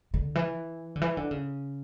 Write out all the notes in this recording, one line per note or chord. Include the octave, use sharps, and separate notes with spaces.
D3
E3
D3
E3
D3
C#3